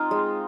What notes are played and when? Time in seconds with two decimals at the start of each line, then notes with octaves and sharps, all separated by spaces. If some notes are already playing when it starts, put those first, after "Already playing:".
Already playing: C4 D#4 F4
0.11 G#3